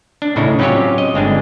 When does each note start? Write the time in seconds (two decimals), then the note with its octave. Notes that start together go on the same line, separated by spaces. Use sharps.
0.22 D4
0.36 A2 C#3 D#4 E4
0.59 F#3 C4 C#4 F4 G4 C#5
0.98 D#5
1.14 G1 G#3 C4 D4